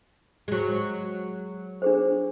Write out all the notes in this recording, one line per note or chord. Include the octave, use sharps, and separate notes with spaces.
F#3 G#3
D4 G#4 C5